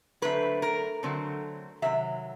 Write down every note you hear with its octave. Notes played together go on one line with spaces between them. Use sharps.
D3 F#3 A3 C4 B4
A#4
D3 F#3 A3 C4
C3 D#3 F#3 E5